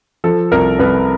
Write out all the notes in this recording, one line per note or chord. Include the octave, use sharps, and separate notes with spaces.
F3 A4
C2 A#4
C2 B4